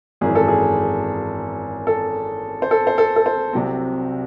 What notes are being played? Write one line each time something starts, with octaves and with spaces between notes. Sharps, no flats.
G#1 F#2 E3 G#4
A4
G#4
A4
C5
A4
C5
A4
A4
C5
C2 C3 F#3 C4